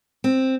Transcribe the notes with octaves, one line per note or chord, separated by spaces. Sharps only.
C4